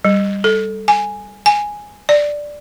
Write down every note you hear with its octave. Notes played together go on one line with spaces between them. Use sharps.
G3
A4
G#5
G#5
D5